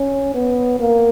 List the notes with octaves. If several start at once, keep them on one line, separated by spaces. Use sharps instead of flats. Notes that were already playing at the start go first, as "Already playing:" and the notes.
Already playing: C#4
B3
A#3